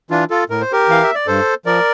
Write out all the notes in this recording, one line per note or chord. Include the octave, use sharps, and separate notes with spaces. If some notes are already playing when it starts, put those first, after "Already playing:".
E3 D4 F4
F4 A4
A2 A#4
C5
G4 A#4
E3 F5
E5
D5
G2 A4 C5
F3 A#4 D5